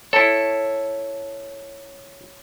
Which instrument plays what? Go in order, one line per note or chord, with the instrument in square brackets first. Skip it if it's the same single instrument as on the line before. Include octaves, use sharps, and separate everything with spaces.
[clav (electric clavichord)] E4 A4 [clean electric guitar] C#5 A5